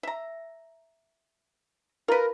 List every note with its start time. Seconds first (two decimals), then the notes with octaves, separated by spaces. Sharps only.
0.03 E5 A#5
2.08 F4 A#4 B4